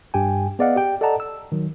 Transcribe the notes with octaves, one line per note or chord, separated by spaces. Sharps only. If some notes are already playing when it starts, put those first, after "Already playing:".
G2 G4 G5 G#5
B3 G#4 D5 D#5 F5 F#5
G4 G5
A4 D5 D#5 F#5 A5 A#5
E6
D#3 F#3